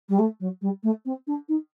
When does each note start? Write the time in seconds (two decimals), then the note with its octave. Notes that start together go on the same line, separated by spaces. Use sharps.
0.09 G3
0.18 A3
0.40 F#3
0.61 G3
0.83 A3
1.05 C4
1.27 D4
1.48 D#4